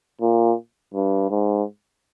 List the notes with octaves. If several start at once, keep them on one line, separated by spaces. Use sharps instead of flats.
A#2
G2
G#2